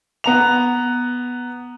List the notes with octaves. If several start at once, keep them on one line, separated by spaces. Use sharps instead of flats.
B3 A#5 F7